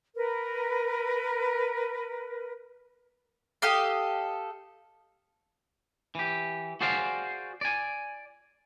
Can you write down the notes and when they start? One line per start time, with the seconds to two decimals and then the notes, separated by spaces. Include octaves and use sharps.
0.15 A#4 B4
3.62 G4 A4 D#5 F5
6.15 E3 G4
6.81 F#4 G#4 C5 D5 F5
7.61 D5 G#5